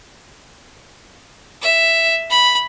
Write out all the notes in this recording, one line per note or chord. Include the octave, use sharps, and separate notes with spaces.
E5
B5